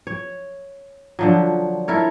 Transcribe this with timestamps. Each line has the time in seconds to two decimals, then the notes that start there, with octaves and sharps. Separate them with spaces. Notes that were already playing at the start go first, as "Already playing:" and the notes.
0.07 C#5
1.19 D3 F3 F#3
1.88 E4 A4 A#4 C#5